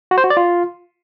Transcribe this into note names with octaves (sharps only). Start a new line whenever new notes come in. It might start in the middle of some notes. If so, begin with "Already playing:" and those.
F#4
C5
F#4
D5
F4